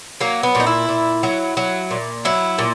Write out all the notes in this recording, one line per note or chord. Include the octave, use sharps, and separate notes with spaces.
F#3 A#3
B3
A#2 D#4
E4
A#2
F#3
F#3
A#2
F#3 E4
A#2